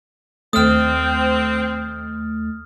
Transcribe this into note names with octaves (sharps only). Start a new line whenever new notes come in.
D#2 A3 C4 D#6 F6